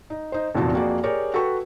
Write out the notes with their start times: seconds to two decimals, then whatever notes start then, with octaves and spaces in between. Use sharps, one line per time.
0.10 D#4
0.32 D#4 C5
0.55 F1 E2 A#2 F#4 A5
0.73 F2 A#3 F#4 G#4 D5
1.03 G4 G#4 A#4 C#5 D5
1.34 F#4 A4 B4 G5 C#6